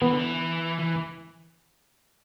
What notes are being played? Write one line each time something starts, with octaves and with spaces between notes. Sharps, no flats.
E3 B3
D3
E3
E3